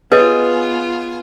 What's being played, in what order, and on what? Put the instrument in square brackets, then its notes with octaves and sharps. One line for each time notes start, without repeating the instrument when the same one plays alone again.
[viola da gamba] B3 F4 [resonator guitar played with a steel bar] G#4 [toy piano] B4 C#5 D#5